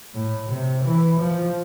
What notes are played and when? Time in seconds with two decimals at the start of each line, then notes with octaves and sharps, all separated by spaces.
0.14 A2
0.49 C3
0.85 E3
1.19 F3